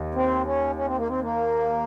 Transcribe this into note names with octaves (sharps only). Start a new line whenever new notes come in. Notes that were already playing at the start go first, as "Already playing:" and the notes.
Already playing: D#2
C4
C#4
C#4
C4
A#3
C4
A#3